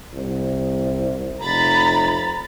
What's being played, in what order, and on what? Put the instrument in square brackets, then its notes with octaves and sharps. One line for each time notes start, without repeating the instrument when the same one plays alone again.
[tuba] C2
[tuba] F1 [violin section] A#5 B5 A6